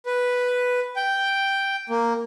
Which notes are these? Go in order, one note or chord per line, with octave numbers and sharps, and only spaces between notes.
B4
G5
A#3